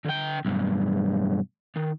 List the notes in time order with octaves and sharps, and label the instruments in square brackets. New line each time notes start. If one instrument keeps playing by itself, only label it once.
[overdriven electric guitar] D3 G5
B1 G2
D#3